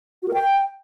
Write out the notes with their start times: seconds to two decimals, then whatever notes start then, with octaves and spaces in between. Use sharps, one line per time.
0.22 F#4
0.28 A#4
0.34 G5